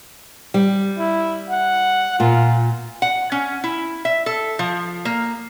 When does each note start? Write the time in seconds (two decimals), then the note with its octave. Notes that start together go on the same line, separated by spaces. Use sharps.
0.54 G3
0.98 E4
1.49 F#5
2.20 A#2 F4
3.02 F#5
3.32 C#4
3.64 E4
4.05 E5
4.26 A4
4.59 F3
5.05 A#3